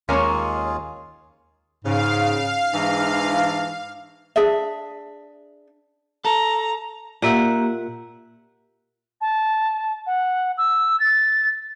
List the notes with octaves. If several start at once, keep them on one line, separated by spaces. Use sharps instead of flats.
D#2 G#3 A#3 C#4 F4 G#4 A#4 C#5
G#2 C#3 F5
G#2 E3 D4
D4 G#4 E5
A4 A#5
A#2 A#3 G4 E5 F#5
A5
F#5
E6
A6